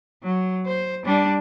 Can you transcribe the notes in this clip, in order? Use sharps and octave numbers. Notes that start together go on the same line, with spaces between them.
F#3
C5
G3 D4